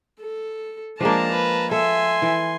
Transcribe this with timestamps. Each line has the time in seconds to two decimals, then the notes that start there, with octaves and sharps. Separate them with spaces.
0.21 A4
1.00 F3 G#3 A#3 D4 A5 A#5
1.32 B4
1.71 A4 E5 G#5 C6
2.22 E3